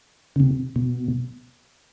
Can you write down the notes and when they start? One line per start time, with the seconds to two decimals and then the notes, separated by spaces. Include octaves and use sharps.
0.36 C#3
0.40 C3
0.76 B2